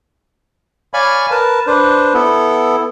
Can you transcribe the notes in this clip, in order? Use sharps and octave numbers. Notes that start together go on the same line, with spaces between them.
C#5 D5 F5 G#5 B5 C#6
A#4 B4 A5
D4 B4 C5
B3 E4 A4